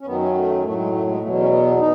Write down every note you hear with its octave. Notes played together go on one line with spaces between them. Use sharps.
C#4
F#2 D#3 F#3 B3
C#4
A3
A2 F#3 A3
G#3
A3
G#3
E2 B2 F#3 A3
C#4
B3
B2 D#4